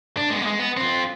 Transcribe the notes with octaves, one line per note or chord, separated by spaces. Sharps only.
D4
G#3 B3
G#3 A#3
B3
C4 F4